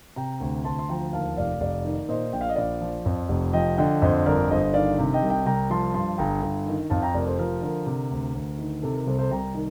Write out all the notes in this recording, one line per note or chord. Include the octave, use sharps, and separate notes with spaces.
C3 G5 A#5
D2
D2 A5 C6
C6
F3 G5 A#5
D#2 F5 A5
F1 D5 F5
F1 D5 F5
D#3
A#2 C5 D#5
A#1 G5
F5
D#5
A#1 D5 F5
F3
F2
F1
F3 D#5 G5
D3 D#5 G5
F2 C5 D#5
G1 A#4 D5
G1 C5 D#5
D#3 D5 F5
C3
D#5 G5
C2
D#5 G5
C2 G5 A#5
F3 A5 C6
G2 A5 C6
G1 G5 A#5
G1
D#3
F2 F5 A5
G5 A#5
F1 A#4 D5
A4 C5
F3 A#4
D3 A#4
C3
D2
D2
D#3
C3 A4
A#4
C2 A4 C5
A4 C5
C2 G5 A#5
D#3